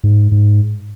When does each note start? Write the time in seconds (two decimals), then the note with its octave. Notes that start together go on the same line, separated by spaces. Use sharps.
0.04 G#2
0.32 G#2